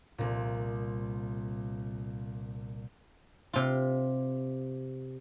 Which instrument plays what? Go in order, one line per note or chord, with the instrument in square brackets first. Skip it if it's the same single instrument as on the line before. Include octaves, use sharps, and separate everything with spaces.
[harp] C2 A#2
[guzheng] C3 F4